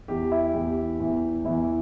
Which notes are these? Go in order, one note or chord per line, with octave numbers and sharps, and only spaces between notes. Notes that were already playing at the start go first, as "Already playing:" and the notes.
E2 E3 G4
E4
E2 E3 G4
E2 E3
E2 E3 E4